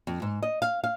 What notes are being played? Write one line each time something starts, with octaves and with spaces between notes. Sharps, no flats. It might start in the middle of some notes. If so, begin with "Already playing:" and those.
F2
G#2
D#5
F5
F5